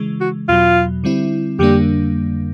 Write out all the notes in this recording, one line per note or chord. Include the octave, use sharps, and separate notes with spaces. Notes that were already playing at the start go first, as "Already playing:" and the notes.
Already playing: C#3 E3 G#3
F#4
E2 B2 F#3 F4
D3 G3 C4 E4
F2 D3 G3 A#3 D4 G4